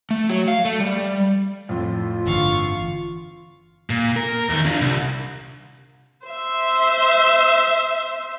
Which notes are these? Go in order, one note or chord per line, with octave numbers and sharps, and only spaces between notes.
A3
F#3
F5
A3
G3
F2 A2 F4
G1 D3 E3 F5 C#6
A#2
A#4
E2 D#3
D4 F4
C2
C5 E5